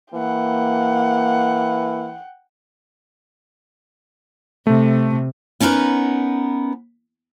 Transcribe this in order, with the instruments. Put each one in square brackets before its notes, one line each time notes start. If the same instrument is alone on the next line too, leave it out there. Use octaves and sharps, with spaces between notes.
[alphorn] E3 [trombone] A#3 [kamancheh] F#5 G5
[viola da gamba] C3 [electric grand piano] A3
[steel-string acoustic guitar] B3 C#4 D#4 A#4 B4